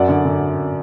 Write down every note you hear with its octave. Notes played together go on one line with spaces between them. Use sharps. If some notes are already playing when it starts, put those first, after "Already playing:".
Already playing: F#2 D5 F#5
D3
D3